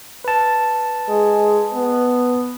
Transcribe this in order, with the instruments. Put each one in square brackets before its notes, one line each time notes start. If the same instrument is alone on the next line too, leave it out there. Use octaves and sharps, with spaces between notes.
[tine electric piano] B4 A5
[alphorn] G#3
B3